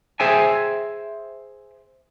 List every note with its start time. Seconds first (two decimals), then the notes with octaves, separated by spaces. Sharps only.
0.20 G#4 C5 E5 G5 G#5